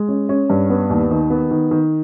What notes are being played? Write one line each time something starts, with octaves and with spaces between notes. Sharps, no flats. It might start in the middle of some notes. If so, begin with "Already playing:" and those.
Already playing: G#3
C#4
C#4
G2
B3
D#2
D#3
B3
D#3
D#3